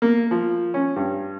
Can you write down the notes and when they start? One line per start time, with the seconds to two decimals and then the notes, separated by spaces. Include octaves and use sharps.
0.02 A#3
0.31 F3
0.74 C#4
0.96 G2